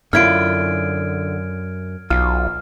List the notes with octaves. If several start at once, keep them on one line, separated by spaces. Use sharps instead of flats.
F#2 D3 E4 F4 F6 G#6 D7
B1 F4 F6